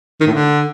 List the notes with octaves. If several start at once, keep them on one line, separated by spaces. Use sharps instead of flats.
D#3
A2
D3